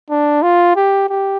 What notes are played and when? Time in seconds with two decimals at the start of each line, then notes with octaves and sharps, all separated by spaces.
0.10 D4
0.43 F4
0.76 G4
1.09 G4